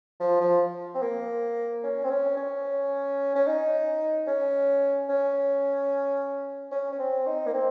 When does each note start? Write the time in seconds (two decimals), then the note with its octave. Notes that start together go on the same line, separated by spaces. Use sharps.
0.20 F3
0.41 F3
0.95 C4
1.02 A#3
1.84 C#4
2.04 C4
2.10 C#4
2.37 C#4
3.36 C#4
3.47 D#4
4.27 C#4
5.09 C#4
6.72 C#4
6.92 C#4
6.99 C4
7.27 D#4
7.47 A#3
7.54 C4